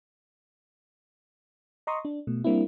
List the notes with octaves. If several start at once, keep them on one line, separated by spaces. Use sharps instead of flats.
D#5 A#5 C6 C#6 D#6
D4
B2 A3
G3 A#3 C4 D4 E4